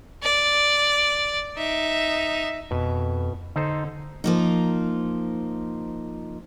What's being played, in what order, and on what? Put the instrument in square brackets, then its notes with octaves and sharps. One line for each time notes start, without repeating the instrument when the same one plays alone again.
[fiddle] D5
D#4 E5
[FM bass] F2 [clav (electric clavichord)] B2
[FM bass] D3 [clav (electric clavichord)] D#4 A4 C5
[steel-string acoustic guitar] F3 A#3 D#4